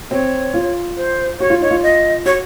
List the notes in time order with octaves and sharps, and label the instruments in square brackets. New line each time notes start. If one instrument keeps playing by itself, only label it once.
[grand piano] C4 [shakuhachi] C#5
[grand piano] F4
[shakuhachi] C5
[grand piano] F#4 [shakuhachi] C#5
[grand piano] F4
[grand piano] D#4 [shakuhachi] C#5
[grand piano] F4
[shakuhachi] D#5
[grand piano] F#4 [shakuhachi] C#5